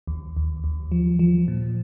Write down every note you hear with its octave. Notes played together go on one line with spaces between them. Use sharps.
D#2
D#2
D#2
F3
F3
A#2